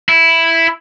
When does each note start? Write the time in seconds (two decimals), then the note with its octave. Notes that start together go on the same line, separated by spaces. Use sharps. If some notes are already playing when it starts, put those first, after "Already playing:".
0.09 E4